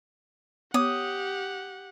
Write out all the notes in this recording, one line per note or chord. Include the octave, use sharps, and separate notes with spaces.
B3 G4 C#5 F#5 D6 D#6